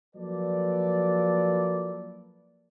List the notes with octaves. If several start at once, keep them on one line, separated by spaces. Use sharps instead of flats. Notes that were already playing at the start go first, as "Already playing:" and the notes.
F3 F#3 A#3 A4 B4 D5